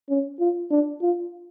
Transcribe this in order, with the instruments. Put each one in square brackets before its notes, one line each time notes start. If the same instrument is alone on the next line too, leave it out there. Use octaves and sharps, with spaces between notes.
[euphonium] C#4
F4
D4
F4